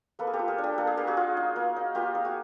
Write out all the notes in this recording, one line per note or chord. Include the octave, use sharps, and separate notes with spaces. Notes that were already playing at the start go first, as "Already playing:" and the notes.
A#3 A4 B4
G#4
G4 A4
F4
G#4 A#4
D4
G4 A4
A#3 A4
G#4
A#3 G4
F#4 G#4
F4
D#4
A#3
D#4
A#3 F4 G4
D#4
F#4 G#4